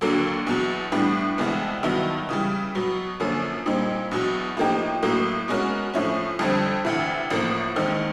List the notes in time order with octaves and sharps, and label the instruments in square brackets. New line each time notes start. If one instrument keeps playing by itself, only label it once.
[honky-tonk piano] D#2 D3 F#3 A#3 D4
E2 B2 F#3
A2 E3 G3 B3 D4
C2 C3 E3 G#3 B3
G2 D#3 F#3 B3 E4
C#3 E3 G3
B2 F#3 B3
F#2 D3 F3 A#3 C#4
A#2 G3 C4 D#4
E2 B2 F#3
A2 F3 A#3 D#4 G4
A2 F#3 A#3
B2 G#3 C#4 F#4 A#4
A2 F3 A3 C#4
F2 D3 G3 C4
D2 C3 E3
A1 A2 F3 A#3
D#2 D#3 G#3 C4 D#4